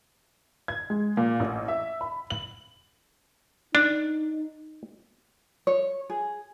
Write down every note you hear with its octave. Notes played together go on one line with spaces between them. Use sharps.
G#6
G#3
A#2
A1
E5
B5
F#7
D4 D#4
C#5
G#4